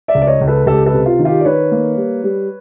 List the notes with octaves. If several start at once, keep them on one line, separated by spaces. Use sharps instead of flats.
D5 E5
C#2
D5
C#5 D#5
C#2
A4 B4
C#2 G4 A4
A4 B4
C3
F4
D#3
F4 G4
D5
D#3 B4 C#5
A#3
G3
G3